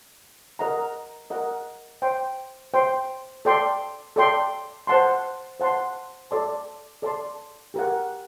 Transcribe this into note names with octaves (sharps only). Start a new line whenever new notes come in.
A#4 D#5 F#5 A#5
A#4 D#5 F#5 A#5
C5 G5 C6
C5 G5 C6
A4 D5 G5 C6
A4 D5 G5 C6
C5 F#5 A5 C6
C5 F#5 A5 C6
A4 D5 A5 C6
A4 D5 A5 C6
G4 A#4 F#5